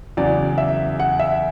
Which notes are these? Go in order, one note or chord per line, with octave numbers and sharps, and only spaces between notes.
E2 C#3 F#3 D5
E5
F#5
E5